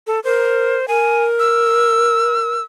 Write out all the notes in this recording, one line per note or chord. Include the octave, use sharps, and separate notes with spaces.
A4
A#4 C5
A#4 G#5
E6